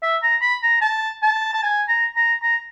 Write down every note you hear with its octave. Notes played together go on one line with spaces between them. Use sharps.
E5
A#5
B5
A#5
A5
A5
A5
G#5
A#5
A#5
A#5